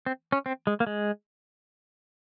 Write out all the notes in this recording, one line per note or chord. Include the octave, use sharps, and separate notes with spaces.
C4
C#4
C4
G#3
A#3
G#3